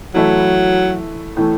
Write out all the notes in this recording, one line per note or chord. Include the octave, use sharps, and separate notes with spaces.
E3 F#3 A3 E4
A2 E3 A3